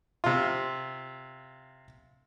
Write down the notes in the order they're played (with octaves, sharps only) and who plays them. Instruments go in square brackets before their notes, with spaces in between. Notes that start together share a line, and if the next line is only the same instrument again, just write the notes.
[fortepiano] C3 F4